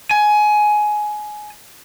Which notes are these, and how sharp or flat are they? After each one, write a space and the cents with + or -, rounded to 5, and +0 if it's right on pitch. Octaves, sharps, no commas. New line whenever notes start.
G#5 +20